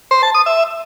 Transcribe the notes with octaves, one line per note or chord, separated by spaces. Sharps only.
C5
A5
D#6
E5